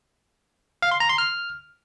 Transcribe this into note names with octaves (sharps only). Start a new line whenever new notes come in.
F5
C6
A#5
C6
F6